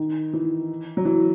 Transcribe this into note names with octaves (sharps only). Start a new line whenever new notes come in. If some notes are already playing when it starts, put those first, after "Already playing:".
Already playing: D#3
E3
F#3
E3